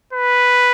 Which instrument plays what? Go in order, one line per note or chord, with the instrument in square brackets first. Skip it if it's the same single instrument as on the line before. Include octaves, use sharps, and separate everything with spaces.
[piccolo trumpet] B4